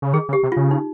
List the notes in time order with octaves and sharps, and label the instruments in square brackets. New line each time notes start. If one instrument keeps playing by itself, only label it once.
[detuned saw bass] C#3
[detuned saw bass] D#3 [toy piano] G#4
[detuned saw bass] C#3
[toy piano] G4
[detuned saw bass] C3
[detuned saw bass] C#3 [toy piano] F4
[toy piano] D#4